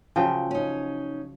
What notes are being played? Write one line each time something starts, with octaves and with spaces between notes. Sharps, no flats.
C#3 F3 F#3 G5
C#4 D#4